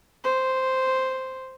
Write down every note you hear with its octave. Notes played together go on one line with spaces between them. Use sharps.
C5